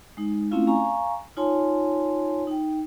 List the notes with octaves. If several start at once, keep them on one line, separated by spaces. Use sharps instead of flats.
G#3 D#4
A3 C4 C#4 E4 F4 F5
F5 G#5 A#5 C#6
D#4 F4 C#5 G#5 A5 C6
D#4 G5